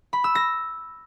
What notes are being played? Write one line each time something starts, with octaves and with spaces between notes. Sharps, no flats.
B5
E6
A#6